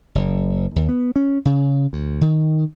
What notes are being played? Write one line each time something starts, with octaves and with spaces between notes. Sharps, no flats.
F#1
D#2
B3
C#4
C#3
D2
D#3